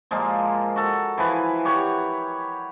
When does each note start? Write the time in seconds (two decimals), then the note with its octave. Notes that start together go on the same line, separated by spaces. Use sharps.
0.11 A#2 F3 G#3 A#3
0.76 F#4 A4
1.18 E3 F3 B4 G#5
1.65 G4 C#5 F#5 C#6